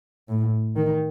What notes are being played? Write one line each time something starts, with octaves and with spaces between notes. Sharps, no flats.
A2
D#3